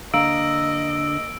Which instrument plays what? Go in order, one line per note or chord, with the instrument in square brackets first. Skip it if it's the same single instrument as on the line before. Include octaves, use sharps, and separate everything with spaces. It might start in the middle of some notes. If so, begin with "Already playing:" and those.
[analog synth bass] D3 [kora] A#3 [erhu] D#5 [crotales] E6 D7